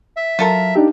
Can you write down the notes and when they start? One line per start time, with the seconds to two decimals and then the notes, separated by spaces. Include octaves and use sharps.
0.17 E5
0.39 F#3 F4 A4 A#4
0.76 D4 D#4 G4